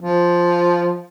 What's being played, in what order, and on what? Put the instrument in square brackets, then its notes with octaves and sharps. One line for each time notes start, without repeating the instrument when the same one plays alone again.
[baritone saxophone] F3